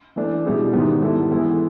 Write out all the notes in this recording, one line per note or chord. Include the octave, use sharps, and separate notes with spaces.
E3 A3 D4
B2 G3 B3 E4 G#4
G#2 D#3 G3 B3
G3 B3 E4 A4
E3 G#3 B3 E4